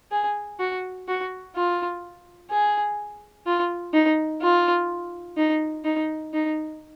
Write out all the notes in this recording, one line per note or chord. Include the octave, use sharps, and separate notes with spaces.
G#4
F#4
F#4
F4
G#4
F4
D#4
F4
D#4
D#4
D#4